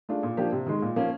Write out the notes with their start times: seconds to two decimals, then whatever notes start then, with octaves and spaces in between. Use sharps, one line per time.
0.09 A3 D4 F4 G#4
0.23 A#2
0.37 F3 A#3 D4 G4
0.52 C3
0.66 D#3 G#3
0.82 A#2
0.96 F3 A#3 C#4